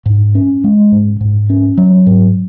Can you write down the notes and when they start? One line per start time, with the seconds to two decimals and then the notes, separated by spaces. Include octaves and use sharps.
0.06 G#2
0.35 C#4
0.64 G#3
0.92 G#2
1.21 G#2
1.50 C#4
1.78 F#3
2.07 G#2